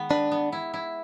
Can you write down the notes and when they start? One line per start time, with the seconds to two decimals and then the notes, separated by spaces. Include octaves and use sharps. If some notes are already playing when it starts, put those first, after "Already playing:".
Already playing: D#3 G#3 B3
0.10 D4 B4
0.32 B3
0.52 E4
0.74 E4